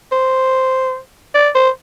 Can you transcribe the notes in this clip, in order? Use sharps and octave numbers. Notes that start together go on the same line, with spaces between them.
C5
D5
C5